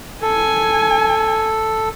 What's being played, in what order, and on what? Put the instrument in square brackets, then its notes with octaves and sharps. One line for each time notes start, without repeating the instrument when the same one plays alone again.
[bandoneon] A4 [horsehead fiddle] G#5